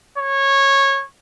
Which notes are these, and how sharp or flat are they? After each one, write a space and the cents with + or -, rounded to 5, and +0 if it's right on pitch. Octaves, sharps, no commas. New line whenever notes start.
C#5 -15